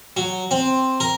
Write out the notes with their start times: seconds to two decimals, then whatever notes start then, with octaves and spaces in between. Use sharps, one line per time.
0.17 F#3
0.51 C4
1.00 A#4